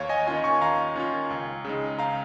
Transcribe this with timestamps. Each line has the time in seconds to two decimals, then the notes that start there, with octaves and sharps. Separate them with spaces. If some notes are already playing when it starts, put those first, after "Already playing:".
Already playing: D#2 C#5 F5
0.09 D#5 G#5
0.27 D#3 C#4 F4 D#5 G#5
0.44 G#5 C#6
0.61 D#2 F5 A#5
0.96 D#3 C#4 F4
1.30 C#2
1.65 C#3 G#3 D#4
1.99 C#2 F5 A#5